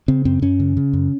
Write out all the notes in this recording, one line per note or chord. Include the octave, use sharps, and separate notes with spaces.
C#3 C4
F#2 C4
F#2 C#4
C#3
C#3
F#2